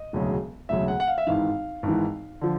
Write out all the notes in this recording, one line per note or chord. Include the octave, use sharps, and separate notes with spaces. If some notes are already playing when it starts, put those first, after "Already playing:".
Already playing: D#5
E1 D2 C#3 F#3
E1 D2 C#3 F#3 E5
F#5
F#5
F5
E5
G#1 G#2 E3 F5
G#1 G#2 E3
D3 F3